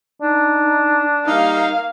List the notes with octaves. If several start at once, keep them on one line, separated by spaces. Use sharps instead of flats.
D4 D#4
G3 A#3 D#4 F5